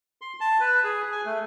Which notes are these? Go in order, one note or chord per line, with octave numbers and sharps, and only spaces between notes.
C6
A5
B4
G#4
G#5
A3